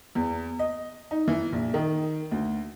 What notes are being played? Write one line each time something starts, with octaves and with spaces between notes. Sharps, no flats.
E2
D#5
D#4
E3
A#1
D#3
D2